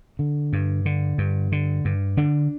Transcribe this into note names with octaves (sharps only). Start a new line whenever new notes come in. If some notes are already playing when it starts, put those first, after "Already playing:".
D3
G2
D3
G2
D3
G2
D3 D4